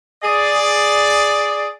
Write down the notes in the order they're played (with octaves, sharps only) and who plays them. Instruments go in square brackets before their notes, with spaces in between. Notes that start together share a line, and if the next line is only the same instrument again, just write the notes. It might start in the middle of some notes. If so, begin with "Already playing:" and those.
[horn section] G#4 D5